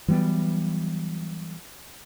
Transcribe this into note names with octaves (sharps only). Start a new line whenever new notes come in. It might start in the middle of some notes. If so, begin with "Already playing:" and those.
E3 F#3 G3 B3